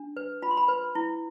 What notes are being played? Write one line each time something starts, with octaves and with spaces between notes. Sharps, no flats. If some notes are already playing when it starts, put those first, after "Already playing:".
Already playing: D4
B4
F4 B5
C6
B5
B4
E4